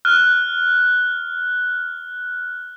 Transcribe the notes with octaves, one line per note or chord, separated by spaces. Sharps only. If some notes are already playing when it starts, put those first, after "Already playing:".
F6 F#6